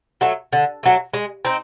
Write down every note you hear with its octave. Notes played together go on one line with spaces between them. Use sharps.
F#3 A3
D3
F#3 A3
G#3
C4 D#4